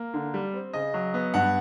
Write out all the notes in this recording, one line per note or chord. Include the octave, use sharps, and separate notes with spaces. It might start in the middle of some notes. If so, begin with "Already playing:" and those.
Already playing: A#3
D3
G3
C4
C#3 D#5
F#3
B3
G2 F#5